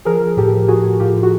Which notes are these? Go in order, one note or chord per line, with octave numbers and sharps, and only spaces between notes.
F3 G#4 A#4
F3
A2 G4 A4
F3
A2 F#4 G#4
A2
A2 F4 G4
A2
F#4